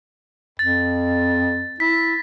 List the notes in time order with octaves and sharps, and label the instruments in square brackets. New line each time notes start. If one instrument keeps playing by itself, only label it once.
[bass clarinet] F2 [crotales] A6
[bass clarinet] E4 [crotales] B6